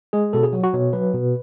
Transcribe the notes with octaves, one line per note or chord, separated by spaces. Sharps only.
G#3 G#4
B2 A4
G#4
F#3 F#4
F#4
B2 C#5
F#3 B4
B2